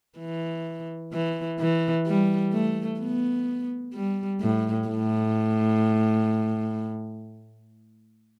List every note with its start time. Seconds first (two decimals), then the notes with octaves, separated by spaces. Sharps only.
0.18 E3
1.13 E3
1.59 E3
2.07 G3
2.53 A3
3.00 B3
3.94 G3
4.41 A2
4.88 A2